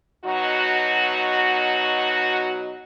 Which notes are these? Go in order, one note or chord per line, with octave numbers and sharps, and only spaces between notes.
B2 F#3 D#4 F#4